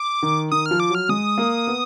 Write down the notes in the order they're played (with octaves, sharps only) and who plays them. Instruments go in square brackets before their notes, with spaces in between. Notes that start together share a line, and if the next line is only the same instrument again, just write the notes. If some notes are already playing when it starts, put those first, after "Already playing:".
Already playing: [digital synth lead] D6
[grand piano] D#3
[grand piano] D#3 [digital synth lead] D#6
[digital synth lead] F6
[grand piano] F3
[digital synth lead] D6
[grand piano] F#3
[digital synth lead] F6
[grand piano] G#3 [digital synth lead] D#6
[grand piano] A#3
B3